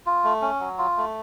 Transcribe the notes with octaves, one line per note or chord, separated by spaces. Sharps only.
F4
A3
C#4
F#3
F4
A3